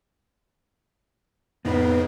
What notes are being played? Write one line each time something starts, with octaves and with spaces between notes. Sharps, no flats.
F2 A2 C#3 B3 D#4 B4